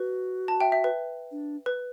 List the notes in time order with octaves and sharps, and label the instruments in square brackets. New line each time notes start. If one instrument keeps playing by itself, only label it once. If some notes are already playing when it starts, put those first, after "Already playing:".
Already playing: [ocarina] F#4 [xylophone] B4
[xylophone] A5
E5 G5
E5
B4
[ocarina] D4
[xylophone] B4